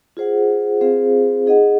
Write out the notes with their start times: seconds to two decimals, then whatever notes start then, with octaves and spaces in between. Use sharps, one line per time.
0.17 F4 G#4 C5 F#5
0.81 C4 F4 G#4 C5 F5
1.46 D#4 G#4 D#5 F#5